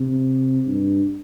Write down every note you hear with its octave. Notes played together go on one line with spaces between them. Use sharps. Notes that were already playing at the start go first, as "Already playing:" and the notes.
Already playing: C3
G2